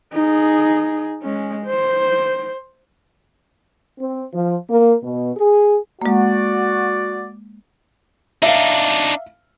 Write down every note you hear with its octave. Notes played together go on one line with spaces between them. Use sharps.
D#4 G#4
G#3 C#4
C5
C4
F3
A#3
B2
G#4
G#3 A#3 F#4 D5
D4 D#4 E5 F5